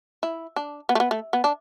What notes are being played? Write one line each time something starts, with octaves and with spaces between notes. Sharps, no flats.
E4
D4
B3
A3
B3
A3
B3
D4